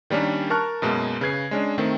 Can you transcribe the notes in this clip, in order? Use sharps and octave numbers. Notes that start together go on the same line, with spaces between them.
D#3 G3 A#3 C#4 D4
A#4 A5 C#6 F6 F#6
F#2 B2 G#3 A#3 B4
C#3 B4 G#6 C7
G#3 C#4 D4
D#3 A3 C4